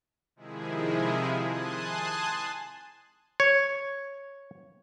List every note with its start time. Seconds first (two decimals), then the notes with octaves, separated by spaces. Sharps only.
0.36 C3 D#3 F3 G#3 E4 G#4
1.44 G#5 A5 C6 D#6 F#6
3.40 C#5